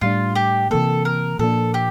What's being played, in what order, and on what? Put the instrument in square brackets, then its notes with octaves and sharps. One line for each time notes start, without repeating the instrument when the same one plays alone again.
[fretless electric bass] A2 G3 D4 [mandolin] F4
[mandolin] G4
[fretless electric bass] C3 E3 A#3 [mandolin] A4
[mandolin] A#4
[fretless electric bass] A#2 F3 A#3 D4 [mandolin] A4
[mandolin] G4